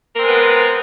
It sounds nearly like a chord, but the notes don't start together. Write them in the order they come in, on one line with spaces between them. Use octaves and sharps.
A#4 C4 G#3 B4 B3